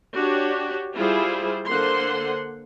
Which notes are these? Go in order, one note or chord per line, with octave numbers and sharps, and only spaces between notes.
D4 F#4 G4 C#5
G3 E4 F4 G#4 C5
D3 A#3 C5 F#5 C6